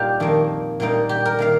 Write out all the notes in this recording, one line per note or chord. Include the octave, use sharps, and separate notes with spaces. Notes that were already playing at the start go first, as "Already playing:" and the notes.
Already playing: A#2 G3 D#4 F4 G4
F2 D#3 A#3
A#2 G3 A#3 D#4
G4
A#4
D#3 A#3 F5